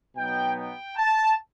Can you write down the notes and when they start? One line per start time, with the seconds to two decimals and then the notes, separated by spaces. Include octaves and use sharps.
0.15 B2 F#3 B3 D#4 G5
0.56 G5
0.96 A5